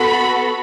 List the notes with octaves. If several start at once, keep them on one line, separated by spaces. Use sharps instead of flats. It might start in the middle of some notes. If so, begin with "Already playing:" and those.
Already playing: B3 F#4 A4 B5